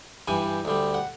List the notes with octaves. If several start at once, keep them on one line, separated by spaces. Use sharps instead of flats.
G2 E3 G3 G#5
D2 D3 G3
F#5